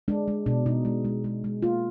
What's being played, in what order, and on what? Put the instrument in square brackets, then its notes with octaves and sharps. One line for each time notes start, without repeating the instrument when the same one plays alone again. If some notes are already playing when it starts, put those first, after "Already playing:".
[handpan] G#3 D4
G#3
B2 D4
B2 D#4
G#3
G#3
G#3
G#3
A#3 F4